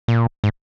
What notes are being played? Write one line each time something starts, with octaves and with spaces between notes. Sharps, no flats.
A#2
G#2